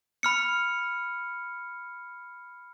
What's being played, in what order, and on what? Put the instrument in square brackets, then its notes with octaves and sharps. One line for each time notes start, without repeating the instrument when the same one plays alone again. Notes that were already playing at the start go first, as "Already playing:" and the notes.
[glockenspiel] B5 F6 C#7